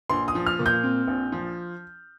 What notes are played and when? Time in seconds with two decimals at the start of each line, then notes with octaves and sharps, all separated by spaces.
0.09 A#1 C6
0.28 D#6
0.35 F3
0.46 F6
0.59 A#2
0.66 G6
0.83 C4
1.07 A#1
1.32 F3